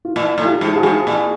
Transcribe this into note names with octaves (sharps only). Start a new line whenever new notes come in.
F4
A#2 E4
A2
F4 G4
G#2
F#4 G#4
G#2
A#2